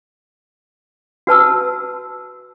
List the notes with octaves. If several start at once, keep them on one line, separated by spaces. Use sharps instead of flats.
F#4 B4 A5 E6